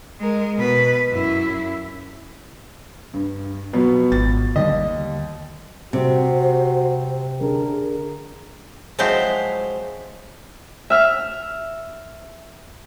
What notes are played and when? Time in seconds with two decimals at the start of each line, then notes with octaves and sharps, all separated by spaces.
0.20 G#3 A#4
0.57 B2 B4
1.10 F#2 E4
3.14 G2
3.73 B2 F3 F#3 B3
4.12 G#1 A6
4.56 D#2 D3 E3 G3 D#5
5.93 C3 G3 C4 F#4 C5
7.41 D3 G#4 A#4
8.99 F3 F#3 G#3 C4 E4 C5
10.90 E5 F6